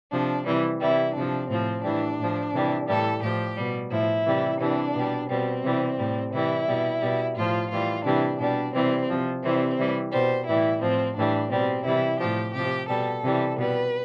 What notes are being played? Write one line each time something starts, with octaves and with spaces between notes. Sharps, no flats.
C3 F3 D4
C3 E3 G3
C3 E3 G3 E4
C3 F3 D4
A2 F3 C4
A2 E3 G3 D4
A2 F3
C3 E3 G3
A2 E3 G3 A4
A2 F3 G4
B2 G3
A2 F3 E4
C3 E3 G3
C3 E3 G3 D4
B2 G3
B2 G3 C4
C3 E3 G3
A2 G3
C3 E3 G3 E4
B2 G3
B2 G3
A2 F3 F4
A2 E3 G3 F4
C3 E3 G3 D4
B2 G3 D4
C3 E3 G3 C4
C3 F3
C3 E3 G3 C4
C3 E3 G3
B2 G3 C5
A2 E3 G3 E4
A2 F3 C4
A2 E3 G3 D4
B2 G3 C4
C3 E3 G3 E4
A2 F3 G4
C3 F3 G4
B2 G3 A4
C3 E3 G3
B2 G3 B4